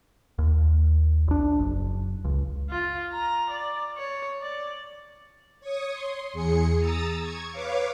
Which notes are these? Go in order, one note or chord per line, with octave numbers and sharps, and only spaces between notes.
D#2
A#1 D4
F#1
C#2
F4
A#5
D5
C#5
D5
C#5 C#6 D#6
C6
E2 G#4 C#7
A#5 D#6 E6 A6
C#6 G#6
B4 C#5 F5 D6